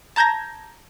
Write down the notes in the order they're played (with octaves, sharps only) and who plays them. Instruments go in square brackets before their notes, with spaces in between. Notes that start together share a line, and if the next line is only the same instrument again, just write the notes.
[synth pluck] A5 A#5 G6 G#6 A#6